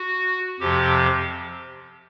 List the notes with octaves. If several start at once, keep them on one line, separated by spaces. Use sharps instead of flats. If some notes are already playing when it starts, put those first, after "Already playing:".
Already playing: F#4
F2 C3 F3 G4